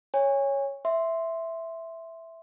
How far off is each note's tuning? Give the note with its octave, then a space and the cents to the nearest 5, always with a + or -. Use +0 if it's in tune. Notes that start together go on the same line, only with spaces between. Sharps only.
C#5 +0 G#5 -30
E5 +0 C6 +0